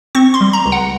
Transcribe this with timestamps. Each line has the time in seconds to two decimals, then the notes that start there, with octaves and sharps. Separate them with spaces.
0.15 C4 C#6
0.34 C6
0.41 G3
0.53 A#5
0.65 C#2
0.72 F#5